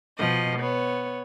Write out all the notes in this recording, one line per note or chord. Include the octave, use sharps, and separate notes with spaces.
B2 F3 D#5
B3 C#5